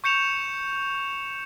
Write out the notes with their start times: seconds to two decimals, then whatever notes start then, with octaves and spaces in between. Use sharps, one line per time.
0.04 C#6 G6 C#7 E7 F7